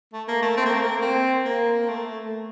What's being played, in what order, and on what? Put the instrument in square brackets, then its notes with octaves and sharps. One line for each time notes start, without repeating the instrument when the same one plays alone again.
[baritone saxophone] A3
A#3
A3
C4
A#3
A3
A#3
C4
A#3
A#3
A3